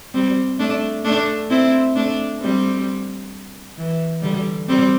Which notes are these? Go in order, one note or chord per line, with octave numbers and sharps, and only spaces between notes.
G3 C4
A3 D4
A3 D4
C4 E4
A3 D4
G3 C4
E3
D3 G3
G3 C4